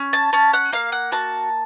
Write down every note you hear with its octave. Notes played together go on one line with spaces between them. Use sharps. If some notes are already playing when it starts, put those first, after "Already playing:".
Already playing: C#4
A5
C#4 A5
F#5
A#3 F5
F#5
F#4 A5